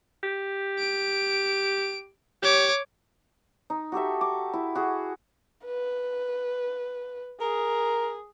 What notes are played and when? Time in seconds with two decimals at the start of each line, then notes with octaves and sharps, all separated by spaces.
0.23 G4
0.79 D7
2.42 G4 C#5 D6
3.70 D#4
3.92 F#4 G4 A4 E5
4.21 D6
4.53 E4
4.75 F#4 G#4
5.65 B4
7.41 G#4 A#4